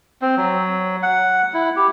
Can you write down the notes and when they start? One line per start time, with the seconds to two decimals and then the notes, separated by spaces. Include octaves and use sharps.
0.22 C4
0.37 F#3
1.03 F#5
1.54 E4
1.76 G4